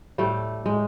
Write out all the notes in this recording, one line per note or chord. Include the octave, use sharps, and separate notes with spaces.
A2 G3 A3
A2 G#3